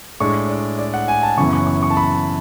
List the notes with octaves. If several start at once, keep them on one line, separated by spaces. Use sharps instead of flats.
A2 G#3 D4 C#6
D5
D5
F#5
G#5
A5
F#1 F#2 E3 B3 C#6
C#6
C#6
C#6
A5
B5